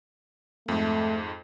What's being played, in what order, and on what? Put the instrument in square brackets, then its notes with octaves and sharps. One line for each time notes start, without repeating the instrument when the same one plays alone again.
[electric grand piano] F2 G#2 [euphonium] A3